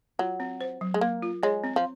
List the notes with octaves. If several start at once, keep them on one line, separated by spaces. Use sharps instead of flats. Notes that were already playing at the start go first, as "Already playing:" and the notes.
F#3 F4
C4
C5
F#3
G#3
A#3 A#4
F4
G#3 C#5
C4
F3